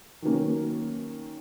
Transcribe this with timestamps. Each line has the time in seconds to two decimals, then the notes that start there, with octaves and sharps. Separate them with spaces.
0.22 D#3 F#3 A#3 C#4